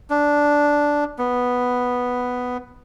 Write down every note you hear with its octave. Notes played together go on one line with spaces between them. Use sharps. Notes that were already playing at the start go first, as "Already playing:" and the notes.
D4
B3